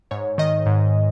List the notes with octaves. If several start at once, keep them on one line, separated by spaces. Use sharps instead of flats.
G#2 C#5
D#3 D#5
G#2